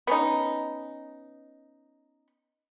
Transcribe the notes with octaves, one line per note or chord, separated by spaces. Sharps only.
B3 C#4 D#4